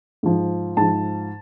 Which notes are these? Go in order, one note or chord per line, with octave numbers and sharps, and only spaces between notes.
G#2 F3
G#2 F3 A5